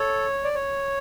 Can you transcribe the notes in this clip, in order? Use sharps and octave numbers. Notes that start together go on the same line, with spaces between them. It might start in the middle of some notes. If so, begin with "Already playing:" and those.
Already playing: A4 C#5
D5
C#5